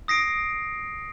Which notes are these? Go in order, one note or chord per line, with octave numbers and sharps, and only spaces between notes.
D#6 A#6 C7 D7